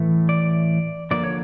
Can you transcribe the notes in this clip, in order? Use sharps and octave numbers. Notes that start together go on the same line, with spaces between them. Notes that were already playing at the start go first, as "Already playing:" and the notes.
Already playing: A2 E3 A3
D5
D3 F3 A#3 D5
C#5